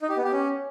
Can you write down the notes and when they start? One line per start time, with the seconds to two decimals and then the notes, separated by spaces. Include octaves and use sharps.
0.02 D#4
0.09 G4
0.17 B3
0.24 G4
0.32 C#4